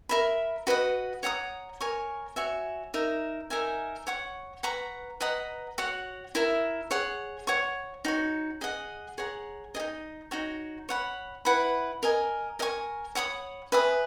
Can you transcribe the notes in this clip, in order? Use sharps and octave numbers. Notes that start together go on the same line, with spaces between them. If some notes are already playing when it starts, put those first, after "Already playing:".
A#4 E5 B5
F#4 B4 D#5 F#5
C#5 F#5 A#5 D#6
A#4 C#5 G#5 C#6
F#4 C#5 E5 G#5
D#4 A#4 E5
D#4 A#4 E5 G#5
C#5 F#5 C#6
B4 F#5 A#5 C#6
B4 D#5 F#5 A#5
F#4 C#5 F#5
E4 A#4 E5
G#4 C#5 F#5
C#5 F#5 C#6
D#4 F#4 C#5
G#4 D#5 F#5
G#4 C#5 F#5 A#5
G#4 D#5
D#4
D#4 F#4 C#5
C#5 F#5 B5
E4 B4 F#5 B5
A#4 D#5 G#5
A#4 D#5 G#5 C#6
C#5 F#5 B5 D#6
B4 E5 G#5 D#6